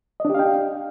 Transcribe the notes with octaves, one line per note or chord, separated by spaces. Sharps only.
D4 G4 D#5 F5 G5